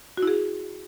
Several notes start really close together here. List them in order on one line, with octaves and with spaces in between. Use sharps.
F#4 E4 G#4